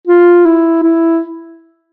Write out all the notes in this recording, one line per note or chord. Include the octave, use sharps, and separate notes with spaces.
F4
E4
E4